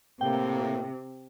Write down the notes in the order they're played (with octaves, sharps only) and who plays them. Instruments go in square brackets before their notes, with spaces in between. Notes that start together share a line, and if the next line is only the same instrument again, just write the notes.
[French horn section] A2 A#3 [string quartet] C3 [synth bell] G5